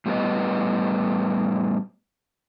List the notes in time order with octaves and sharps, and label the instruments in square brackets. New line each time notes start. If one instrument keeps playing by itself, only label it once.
[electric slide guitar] A2 G3 A3 B3 B4 D#5